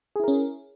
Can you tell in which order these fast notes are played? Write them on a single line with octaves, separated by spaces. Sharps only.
G#4 E4 A#4 C#4